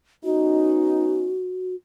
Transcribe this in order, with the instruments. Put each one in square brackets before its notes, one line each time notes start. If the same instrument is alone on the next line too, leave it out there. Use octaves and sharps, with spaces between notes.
[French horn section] B3 C#4 D#4 [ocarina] F#4